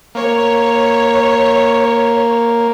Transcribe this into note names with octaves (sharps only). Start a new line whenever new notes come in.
A#3 C#5